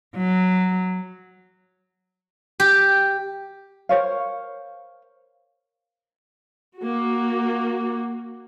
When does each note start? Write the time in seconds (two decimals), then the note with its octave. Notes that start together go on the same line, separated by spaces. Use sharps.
0.18 F#3
2.60 G4
3.89 A#4 C5 C#5 F5
6.79 A#3 F#4